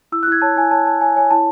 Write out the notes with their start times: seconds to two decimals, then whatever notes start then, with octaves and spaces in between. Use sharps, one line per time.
0.12 E4 E6
0.23 F#6
0.28 E4 G#6
0.42 C#5 A5
0.56 E4 G#5
0.71 C#5 A5
0.87 C#5 A5
1.01 C#5 G#5
1.16 C#5 G#5
1.31 E4 A5